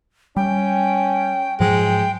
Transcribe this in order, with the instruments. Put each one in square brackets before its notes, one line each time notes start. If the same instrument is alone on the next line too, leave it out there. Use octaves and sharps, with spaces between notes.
[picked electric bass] G3 [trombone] C#4 [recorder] G5
[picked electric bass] G#2 F3 F#3 [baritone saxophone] G#3 [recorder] G5